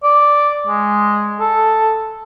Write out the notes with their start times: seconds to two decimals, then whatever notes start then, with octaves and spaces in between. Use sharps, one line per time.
0.03 D5
0.67 G#3
1.40 A4